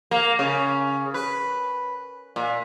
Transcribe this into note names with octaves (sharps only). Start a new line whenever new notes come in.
A#3
C#3
B4
A#2